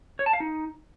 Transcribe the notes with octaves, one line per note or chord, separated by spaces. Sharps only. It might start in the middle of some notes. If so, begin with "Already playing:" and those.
C#5
A5
F5
D#4